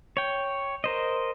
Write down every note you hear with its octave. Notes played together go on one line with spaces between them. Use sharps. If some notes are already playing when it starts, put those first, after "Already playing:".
C#5 G5
A#4 C5 D#5